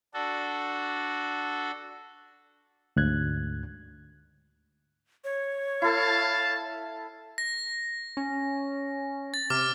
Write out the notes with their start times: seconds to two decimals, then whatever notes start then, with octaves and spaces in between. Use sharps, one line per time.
0.14 D4 F#4 A4
2.96 D2 G#2 F#6 G#6
5.24 C#5
5.82 E4 A4 F5 A5
7.38 A#6
8.17 C#4
9.34 A6
9.50 C3 D6 F6